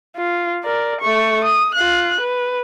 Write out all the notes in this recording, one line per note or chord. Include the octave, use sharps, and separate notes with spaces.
F4
A#4 D5
A3 C#6
D#6
F4 F#6
B4